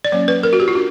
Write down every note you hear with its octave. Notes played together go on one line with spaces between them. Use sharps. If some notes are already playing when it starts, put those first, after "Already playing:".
D5
F#3 A#3 C#4 C#5
B4
A#4
F#4
G4
F4
D4 F#4